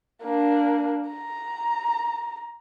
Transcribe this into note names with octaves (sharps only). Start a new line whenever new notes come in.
A#3 D4
A#5